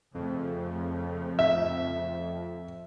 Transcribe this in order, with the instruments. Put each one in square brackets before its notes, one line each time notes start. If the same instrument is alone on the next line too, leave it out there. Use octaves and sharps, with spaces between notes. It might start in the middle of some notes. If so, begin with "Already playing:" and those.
[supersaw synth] F2 [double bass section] C#3 F3 A3
[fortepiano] E5